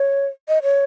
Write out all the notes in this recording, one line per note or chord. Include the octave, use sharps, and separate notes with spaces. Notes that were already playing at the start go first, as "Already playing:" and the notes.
Already playing: C#5
D#5
C#5